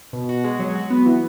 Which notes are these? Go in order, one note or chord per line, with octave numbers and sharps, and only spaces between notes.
B2
F#4
G#3
F#3
F#4
B3
E3